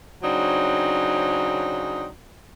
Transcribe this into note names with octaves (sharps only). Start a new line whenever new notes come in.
C#3 F#3 C4 D4 D#4